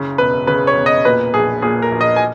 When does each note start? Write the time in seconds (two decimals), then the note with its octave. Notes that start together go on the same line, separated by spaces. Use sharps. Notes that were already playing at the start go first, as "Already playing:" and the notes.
Already playing: F#1 C#3
0.18 E1 B4
0.47 C#3 B4
0.67 C#5
0.77 E1
0.86 D#5
1.05 A#2 B4
1.34 A#1 G#4
1.62 A#2 G#4
1.82 A#4
1.92 A#1
2.01 D#5
2.16 G#5